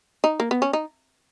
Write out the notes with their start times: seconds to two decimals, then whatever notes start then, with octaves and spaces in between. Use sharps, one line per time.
0.24 D#4
0.40 A#3
0.51 B3
0.62 C#4
0.73 D#4